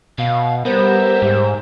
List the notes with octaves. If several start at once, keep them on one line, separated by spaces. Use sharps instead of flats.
B2 F5
G3 B3 G4 A#4 C5 E5
G#2